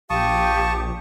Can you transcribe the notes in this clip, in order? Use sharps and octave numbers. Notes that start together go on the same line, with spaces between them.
A#1 G4 F5 A5 C#6 D#6